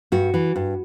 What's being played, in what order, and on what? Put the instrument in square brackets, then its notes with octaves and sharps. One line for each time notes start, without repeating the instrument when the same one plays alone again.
[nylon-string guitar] G2 F#4
E3
G2